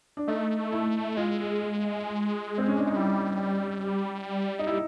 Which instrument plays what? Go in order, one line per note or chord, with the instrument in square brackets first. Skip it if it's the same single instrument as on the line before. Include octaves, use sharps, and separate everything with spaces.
[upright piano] D4
[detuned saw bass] A3 [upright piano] D#4
[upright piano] E4
[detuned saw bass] G#3 [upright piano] F4
[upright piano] C4
C#4
D4
D#4
[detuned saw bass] G3 [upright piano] E4
[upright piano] D#4
E4